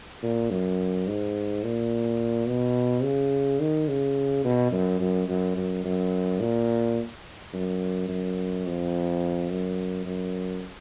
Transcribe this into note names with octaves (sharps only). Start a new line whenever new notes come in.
A#2
F#2
G#2
A#2
B2
C#3
D#3
C#3
B2
F#2
F#2
F#2
F#2
F#2
A#2
F#2
F#2
F2
F#2
F#2